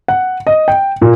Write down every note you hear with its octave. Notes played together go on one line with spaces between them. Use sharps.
F#5
D#5
G5
A#2